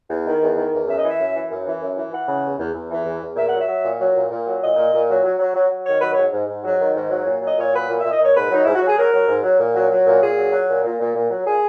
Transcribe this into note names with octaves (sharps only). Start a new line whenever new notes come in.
E2
D#3
E2
D#3
E2
F#2 E5
D#5
E3
E5
F#2
E3
F#2
E3
F#2
E3
E3 F#5
C#3
E2
E2
E2
E3
E2
E2
A#2 E5
F#3 F#5
E5
F#3
A#2
F#3
A#2
A#2
F#3
A#2 D#5
A#2
A#2
F#3
F#3
F#3
F#3
F#3
D#3 C#5
F#3 B4
G#2 C#5
G#2
G#2
F#3
D#3
G#2
F#3
A#2
F#3 D#5
A#2 C#5
F#3 B4
A#2
A#2 E5
D#5
A#2 C#5
G#2 B4
F#3 D#4
G#2 E4
F#4
F#3
G#4
F#3 A#4
F#3
G#2
F#3
A#2
F#3
F#3
A#2
A#2 G#4
F#3
F#3
A#2
A#2
A#2
A#2
F#3
A#2 G#4